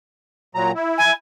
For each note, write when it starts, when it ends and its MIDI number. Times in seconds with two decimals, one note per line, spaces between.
0.55 0.72 46
0.55 0.72 54
0.55 0.72 82
0.75 1.13 64
0.98 1.12 80